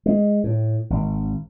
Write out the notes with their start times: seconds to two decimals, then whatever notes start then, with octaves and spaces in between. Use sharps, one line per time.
0.06 G#3
0.44 A2
0.90 G#1